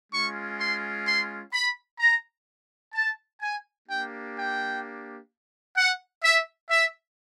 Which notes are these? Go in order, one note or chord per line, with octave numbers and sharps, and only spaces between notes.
G#3 C#4 F4 C#6
C6
C6
B5
A#5
A5
G#5
A#3 D4 G4 G5
G5
F#5
E5
E5